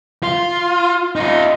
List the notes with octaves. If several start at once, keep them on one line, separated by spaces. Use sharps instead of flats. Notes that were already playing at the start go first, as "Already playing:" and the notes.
F4
D#4 F4